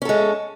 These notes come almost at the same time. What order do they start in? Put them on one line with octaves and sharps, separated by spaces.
C#4 A4 G#3